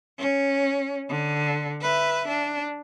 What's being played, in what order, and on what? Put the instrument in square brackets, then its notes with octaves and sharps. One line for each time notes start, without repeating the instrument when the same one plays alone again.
[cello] C#4
D3
B4 E5
D4